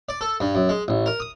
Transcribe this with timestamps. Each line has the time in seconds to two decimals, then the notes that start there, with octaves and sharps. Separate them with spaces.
0.09 D5
0.21 A4
0.40 G2
0.55 F#2
0.69 G#3
0.88 A1
1.06 A#4
1.20 D#6